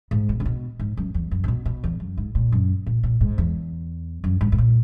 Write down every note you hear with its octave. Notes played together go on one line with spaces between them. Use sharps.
G#2
B2
C#3
B2
G#2
F#2
E2
F#2
C#3
B2
B2
E2
F#2
G#2
A#2
F#2
A#2
A#2
G#2
E2
F#2
G#2
G#2
A#2